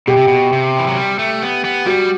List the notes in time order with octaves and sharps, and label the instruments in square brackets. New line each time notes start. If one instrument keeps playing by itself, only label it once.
[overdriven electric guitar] B2 [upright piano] G4
[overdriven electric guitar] C3
B2
C3
E3
F#3
G3
A3
B3
B3
[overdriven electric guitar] G3 [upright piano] F#4